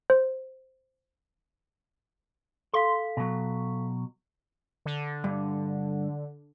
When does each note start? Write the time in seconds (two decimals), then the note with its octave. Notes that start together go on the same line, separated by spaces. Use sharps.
0.10 C5
2.74 A4 F5 C6 B6
3.17 B2 F#3
4.86 D3
5.24 G2